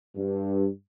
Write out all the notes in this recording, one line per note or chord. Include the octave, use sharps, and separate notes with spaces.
G2